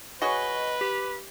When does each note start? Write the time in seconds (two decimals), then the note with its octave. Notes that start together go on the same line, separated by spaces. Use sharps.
0.22 F#4 G#4 B4 C#5 D#5
0.81 G4